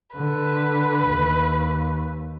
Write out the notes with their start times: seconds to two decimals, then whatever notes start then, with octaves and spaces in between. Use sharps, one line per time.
0.16 D3 B4
1.09 D#2